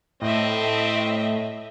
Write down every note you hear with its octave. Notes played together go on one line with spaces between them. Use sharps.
A2 C4 D#5 E5